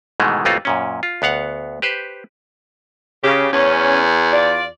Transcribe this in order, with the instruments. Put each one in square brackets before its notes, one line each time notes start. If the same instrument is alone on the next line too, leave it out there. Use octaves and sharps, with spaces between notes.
[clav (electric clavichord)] G#2 B2 D#3 E3 G#3 A3
A1 F2 A3 A#3 F4 F#4
F#2 A#2 C#4
F4
D2 B3 F5 F#5
G4 B4 C5
[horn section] C#3 [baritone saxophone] G4
[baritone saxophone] E2 [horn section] C#4
[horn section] F4 D5